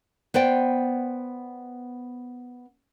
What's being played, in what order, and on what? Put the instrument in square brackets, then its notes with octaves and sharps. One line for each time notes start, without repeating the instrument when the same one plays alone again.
[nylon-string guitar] B3 C5 D5 G5